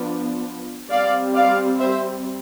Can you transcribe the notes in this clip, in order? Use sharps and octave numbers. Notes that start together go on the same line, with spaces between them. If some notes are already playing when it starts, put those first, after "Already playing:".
Already playing: F3 B3 D4
G3 C4 D5 F5
D5 F5
C5 E5